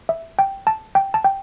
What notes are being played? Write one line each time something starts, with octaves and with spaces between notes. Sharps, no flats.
E5
G5
A5
G5
A5
G5